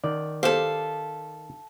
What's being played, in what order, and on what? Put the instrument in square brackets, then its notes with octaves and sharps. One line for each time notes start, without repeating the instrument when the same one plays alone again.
[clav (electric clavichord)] D#3 D5
[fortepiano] G4 C5 [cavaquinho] A4 F5